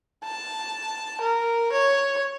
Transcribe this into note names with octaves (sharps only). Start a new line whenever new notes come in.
A5
A#4
C#5